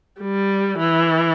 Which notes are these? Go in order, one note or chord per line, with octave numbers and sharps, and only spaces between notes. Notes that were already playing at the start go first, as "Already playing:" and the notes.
G3
E3